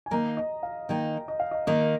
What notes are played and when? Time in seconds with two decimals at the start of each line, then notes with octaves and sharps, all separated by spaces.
0.06 G#5
0.11 D#3 A#3 D#4 A#5
0.37 D#5
0.63 F5
0.89 D#3 A#3 D#4 G5
1.28 D#5
1.40 F5
1.51 D#5
1.67 D#3 A#3 D#4 D#5